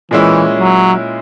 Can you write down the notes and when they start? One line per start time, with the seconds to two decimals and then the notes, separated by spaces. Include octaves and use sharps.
0.11 A#2 E3 G#3 C#4 E4
0.59 F#3